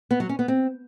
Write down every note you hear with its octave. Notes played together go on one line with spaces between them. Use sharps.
B3
F#3
C#4
B3
C4